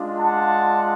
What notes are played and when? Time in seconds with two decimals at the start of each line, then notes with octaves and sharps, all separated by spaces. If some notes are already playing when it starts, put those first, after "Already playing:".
Already playing: G#3 D4 F4
0.18 F#5 A5